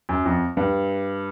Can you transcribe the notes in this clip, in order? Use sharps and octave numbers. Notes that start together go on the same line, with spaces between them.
F#2
F2
G2